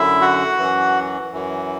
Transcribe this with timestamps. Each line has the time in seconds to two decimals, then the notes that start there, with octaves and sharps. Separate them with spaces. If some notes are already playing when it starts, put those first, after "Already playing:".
Already playing: F#2 D3 E4 E5
0.21 F#4 F#5
0.59 F#2 E3
1.33 F#2 E3